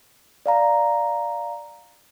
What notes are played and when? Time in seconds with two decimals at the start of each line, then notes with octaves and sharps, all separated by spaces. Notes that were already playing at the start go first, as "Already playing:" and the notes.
0.46 D5 F5 A#5